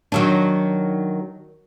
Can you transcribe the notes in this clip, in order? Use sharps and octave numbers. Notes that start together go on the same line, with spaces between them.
D#3 F#3 D4